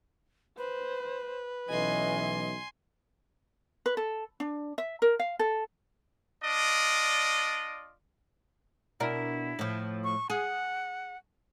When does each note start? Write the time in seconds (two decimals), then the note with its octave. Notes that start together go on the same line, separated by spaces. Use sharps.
0.58 B4 C5
1.69 B1 E3 C#4 D#5 G#5 C6
3.86 B4
3.97 A4
4.40 D4
4.78 E5
5.02 A#4
5.19 F5
5.39 A4
6.44 D4 F4 D5 D#5
9.00 B2 D4 E4 A#4
9.59 A2 F3
10.04 C#6
10.30 G#4 F#5